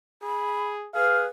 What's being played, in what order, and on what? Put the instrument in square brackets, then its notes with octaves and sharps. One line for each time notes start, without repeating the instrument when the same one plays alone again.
[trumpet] G#4 [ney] B5
[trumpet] G#4 [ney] B4 [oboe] F5